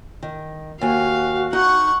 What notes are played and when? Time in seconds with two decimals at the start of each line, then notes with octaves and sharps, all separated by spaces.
0.23 D#3
0.81 D#2 F#4 F5 G#5
1.53 D#4 F#5 C#6